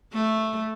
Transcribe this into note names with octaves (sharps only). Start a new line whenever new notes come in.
A3